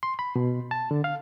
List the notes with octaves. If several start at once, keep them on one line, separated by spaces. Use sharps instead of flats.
C6
B5
B2
A5
D3
F5